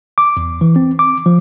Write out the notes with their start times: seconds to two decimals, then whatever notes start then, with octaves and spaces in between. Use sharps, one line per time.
0.18 D6
0.37 E2
0.61 E3
0.76 C4
0.99 D6
1.26 F3